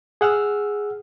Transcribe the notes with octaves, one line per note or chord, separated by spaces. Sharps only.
G#4 F#5 E6 F6